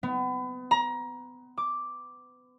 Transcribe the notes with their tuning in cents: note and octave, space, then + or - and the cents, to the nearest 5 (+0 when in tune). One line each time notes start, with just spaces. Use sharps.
B3 +30
A#5 +25
D6 +0